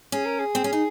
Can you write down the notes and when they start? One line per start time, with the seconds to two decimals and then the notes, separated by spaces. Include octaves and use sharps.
0.12 C#4 G#4
0.25 A#4
0.39 G#4
0.55 C4
0.64 C#4
0.73 D#4